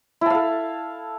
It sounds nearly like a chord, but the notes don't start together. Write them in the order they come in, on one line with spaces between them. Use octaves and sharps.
E4 A5 F5 A4